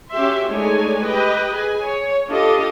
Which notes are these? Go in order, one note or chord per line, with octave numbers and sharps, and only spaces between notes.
C#4 F#4 G4 E5 C6
G#3 A3 D4 D#4 C#5 G#5
G4 B4 D#5 G5
G#4 G#5
C#5
D4 F4 G4 A4 D#5